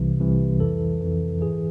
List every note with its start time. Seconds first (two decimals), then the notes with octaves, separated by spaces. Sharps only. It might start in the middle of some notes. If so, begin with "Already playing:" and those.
Already playing: C2 C3 E3
0.19 C2 C3 E3
0.60 F2 E3 A4
1.01 F2 E3
1.41 G#2 E3 G#4